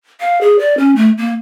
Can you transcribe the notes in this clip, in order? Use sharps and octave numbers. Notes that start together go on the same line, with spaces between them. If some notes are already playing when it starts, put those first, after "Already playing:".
F5
G#4
D5
C#4
A3
A#3